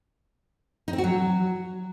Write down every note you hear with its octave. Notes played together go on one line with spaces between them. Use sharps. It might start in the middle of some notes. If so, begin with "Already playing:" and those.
D#4
C4
F#4
F#3